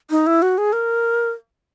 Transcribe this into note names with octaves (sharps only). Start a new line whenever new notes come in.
D#4
E4
F#4
G#4
A#4